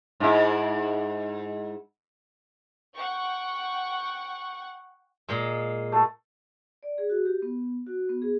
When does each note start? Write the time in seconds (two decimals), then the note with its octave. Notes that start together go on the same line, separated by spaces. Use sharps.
0.20 G#2 E4
2.94 F#5 G5 C#6
5.29 A#2 G#3
5.92 A3 A4
6.83 D5
6.98 G#4
7.09 F#4
7.25 G4
7.42 B3
7.87 F#4
8.09 B3
8.22 G#4